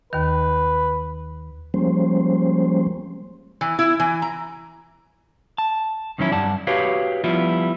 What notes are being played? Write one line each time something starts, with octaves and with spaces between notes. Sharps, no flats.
D#2 D#3 B4
F3 G3 G#3 A#3 C#4 C5
E3
E4
E3
A#5
A5
F2 D#3 F#3 C#4 E4
G2 G3 D5 F#5 A5
F#4 G4 B4 C#5 F5
F3 G3 B3 E4 F4